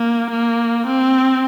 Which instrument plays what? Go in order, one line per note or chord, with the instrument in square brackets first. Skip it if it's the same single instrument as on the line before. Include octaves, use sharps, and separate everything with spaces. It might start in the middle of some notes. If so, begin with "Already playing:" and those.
Already playing: [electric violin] A#3
A#3
C4